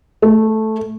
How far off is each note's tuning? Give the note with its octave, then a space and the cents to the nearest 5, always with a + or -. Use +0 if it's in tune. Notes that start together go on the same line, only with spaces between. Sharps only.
A3 -5